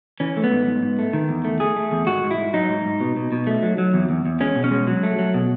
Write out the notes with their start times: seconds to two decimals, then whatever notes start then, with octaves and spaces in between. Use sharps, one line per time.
0.20 E3 C#4
0.37 A3
0.44 B3
0.52 G#2
0.67 G#2
0.83 G#2
0.99 A3
1.13 D#3
1.29 E2
1.45 A3
1.60 A3 G#4
1.76 A3
1.92 E2
2.07 G#2 F#4
2.23 G#2
2.31 E4
2.38 G#2
2.53 F#3 D#4
2.69 G#2
2.85 G#2
3.01 B2
3.17 B2
3.32 B2
3.47 A3
3.63 F#3
3.78 F#3
3.94 E2
4.10 E2
4.26 E2
4.41 G#3 C#4
4.55 B2
4.64 C#4
4.71 G#3
4.87 F#3
5.03 A3
5.19 F#3
5.34 B2